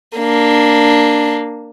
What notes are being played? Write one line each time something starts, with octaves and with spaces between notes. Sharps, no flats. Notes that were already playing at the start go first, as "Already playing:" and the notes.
A#3 D4